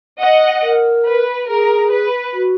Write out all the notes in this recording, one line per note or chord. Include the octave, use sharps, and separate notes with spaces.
D#5 F#5
A#4
B4
G#4 A#4
B4
F#4